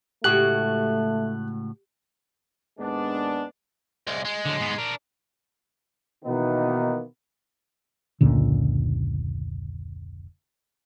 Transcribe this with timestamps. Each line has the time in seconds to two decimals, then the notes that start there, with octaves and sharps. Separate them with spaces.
0.24 C#2 A2 A3 F#4 G4 F#6
2.79 D#2 G#2 G#3 B3 D4
4.07 C2 G#3
4.25 G#3
4.45 D3 F#3
4.60 G#2 B3
4.78 D4 A#4
6.25 B2 D#3 E3 A#3 B3 D#4
8.21 F1 C#2 A#2 D3